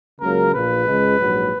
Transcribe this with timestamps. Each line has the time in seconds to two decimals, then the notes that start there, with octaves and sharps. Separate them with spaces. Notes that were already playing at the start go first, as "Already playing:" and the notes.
0.21 C#2 C#3 F#3 A#3 A#4
0.53 A#1 A#2 A#3 B4
0.86 C#2 C#3 G#3
1.19 A#1 G#2 F#3